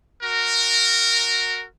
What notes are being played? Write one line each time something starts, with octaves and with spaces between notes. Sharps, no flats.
F#4 A#4